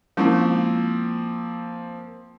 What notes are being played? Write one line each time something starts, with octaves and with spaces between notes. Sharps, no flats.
F3 G#3 A#3 C4 C#4 E4